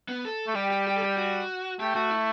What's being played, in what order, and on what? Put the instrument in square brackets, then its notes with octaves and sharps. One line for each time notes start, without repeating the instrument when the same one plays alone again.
[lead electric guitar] B3
A4
[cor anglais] A3
[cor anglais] G3 [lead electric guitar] G4
[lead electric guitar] G4
G4
A4
G4
F#4
[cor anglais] A3 [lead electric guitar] G4
[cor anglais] A3 [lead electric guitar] F#4
[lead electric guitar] E4